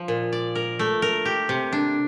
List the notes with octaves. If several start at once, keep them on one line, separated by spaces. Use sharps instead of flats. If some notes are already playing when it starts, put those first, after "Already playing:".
Already playing: F3
A#2
D5
A#4
A3
A#4
G4
C3
D4